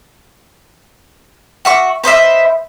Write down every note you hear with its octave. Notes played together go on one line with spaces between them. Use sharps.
F#4 E5 C#6
B4 C5 D#5 E5